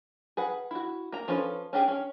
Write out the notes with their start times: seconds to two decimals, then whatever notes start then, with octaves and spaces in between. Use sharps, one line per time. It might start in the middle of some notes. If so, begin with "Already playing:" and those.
0.37 G#4 B4 F#5
0.71 E4 F#4
1.12 A#3 A#5
1.28 F3 C#4 F4 A4 B4
1.73 C#4 D4 G4 G#4
1.88 C#4